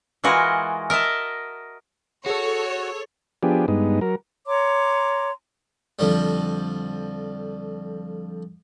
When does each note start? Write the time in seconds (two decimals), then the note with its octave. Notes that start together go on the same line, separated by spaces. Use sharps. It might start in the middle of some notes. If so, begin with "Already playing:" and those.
0.24 E3 G#3 F4 F#4 A#4 D#5
0.90 A#4 D#5 E5 A5
2.26 F#4 G#4 A4 C#5
3.43 F3 B3 D4 G4 G#4
3.68 G2 G#3 B3 D#4
4.01 F#3 A#4
4.46 C#5 A#5 C6 D6
5.99 F2 D3 F3 G3